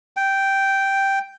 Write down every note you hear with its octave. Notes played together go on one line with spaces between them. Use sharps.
G5